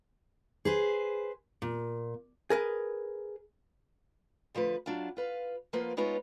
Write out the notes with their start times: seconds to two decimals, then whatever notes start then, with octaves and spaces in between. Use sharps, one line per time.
0.65 G#4 B4 C5
1.62 A#2
2.50 G#4 A#4 B4
4.55 D3 F3 A3 B4
4.86 F#3 D4 E4 F4
5.17 F4 B4 F5
5.73 F3 A#3 B3 F4 B4
5.97 G#3 B3 D#4 F4 B4 C#5